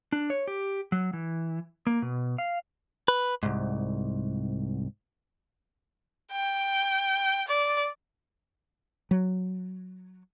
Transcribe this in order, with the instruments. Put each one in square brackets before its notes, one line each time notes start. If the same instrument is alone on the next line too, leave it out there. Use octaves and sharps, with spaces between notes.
[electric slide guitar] D4
C#5
G4
F#3
E3
A#3
B2
F5
[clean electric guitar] B4
C2 G#2
[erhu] G5
D5
[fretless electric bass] F#3